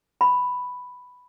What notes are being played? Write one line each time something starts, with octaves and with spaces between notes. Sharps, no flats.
B5